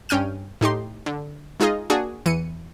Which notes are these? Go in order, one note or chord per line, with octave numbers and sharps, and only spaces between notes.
G2 C#4 G5 F6 D#7
A2 D#4 G4 C6
D3
G#3 D#4 F4 G#4 D#5
A#3 D4 F#4 G#4
E2 E3 C#7 D#7